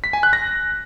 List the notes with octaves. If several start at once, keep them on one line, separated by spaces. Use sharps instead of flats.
B6
G#5
F#6
A#6